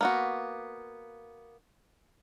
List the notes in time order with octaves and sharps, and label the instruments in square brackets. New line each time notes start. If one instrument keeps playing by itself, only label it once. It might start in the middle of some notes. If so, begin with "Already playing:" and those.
[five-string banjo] A#3 B3 F#4